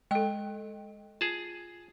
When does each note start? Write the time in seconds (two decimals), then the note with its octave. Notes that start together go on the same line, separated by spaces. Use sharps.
0.11 G#3 A4 D#5 G5
1.21 F4 G#4 A5